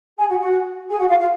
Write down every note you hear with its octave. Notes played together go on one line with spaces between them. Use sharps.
G#4 G#5
F#4 F#5
F#4 F#5
G#4 G#5
F#4 F#5
F4 F5
F4 F5